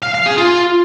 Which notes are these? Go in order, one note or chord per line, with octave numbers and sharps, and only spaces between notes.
F5
F5
G#4
F4